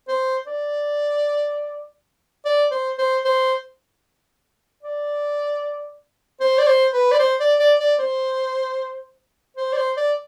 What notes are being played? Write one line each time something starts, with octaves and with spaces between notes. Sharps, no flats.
C5
D5
D5
C5
C5
C5
D5
C5
D5
C5
B4
D5
C5
D5
D5
D5
C5
C5
D5
C5
D5